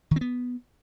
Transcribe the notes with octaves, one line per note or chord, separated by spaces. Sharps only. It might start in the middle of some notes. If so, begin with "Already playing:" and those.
D#3
C4
B3